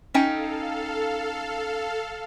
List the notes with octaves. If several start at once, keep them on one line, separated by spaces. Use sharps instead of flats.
C#4 D#4 A4 F5 G5